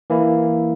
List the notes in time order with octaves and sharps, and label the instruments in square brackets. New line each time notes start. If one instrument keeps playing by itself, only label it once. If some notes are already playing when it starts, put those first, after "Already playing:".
[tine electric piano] E3 A#3 E4